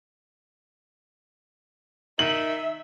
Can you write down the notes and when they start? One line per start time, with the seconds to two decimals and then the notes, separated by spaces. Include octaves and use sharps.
2.19 D#3 E5 F#7